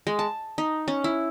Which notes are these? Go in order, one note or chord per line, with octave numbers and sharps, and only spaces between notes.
G#3
A5
D#4
C#4
E4